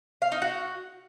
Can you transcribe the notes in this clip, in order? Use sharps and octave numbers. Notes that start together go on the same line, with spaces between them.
F5
D#4
F#4